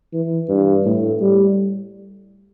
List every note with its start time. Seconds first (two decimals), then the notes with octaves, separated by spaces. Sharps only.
0.14 E3
0.49 G2
0.85 A2
1.20 G3